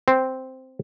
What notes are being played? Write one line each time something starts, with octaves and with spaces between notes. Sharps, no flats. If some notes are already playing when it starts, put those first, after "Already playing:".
C4